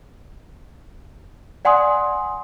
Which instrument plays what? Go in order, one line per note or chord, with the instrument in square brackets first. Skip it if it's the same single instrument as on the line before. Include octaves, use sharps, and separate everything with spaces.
[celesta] D5 F#5 G#5 C6 D#6